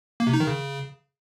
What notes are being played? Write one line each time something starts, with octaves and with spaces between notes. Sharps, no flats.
A#3
C3
D#4
D#3
C#3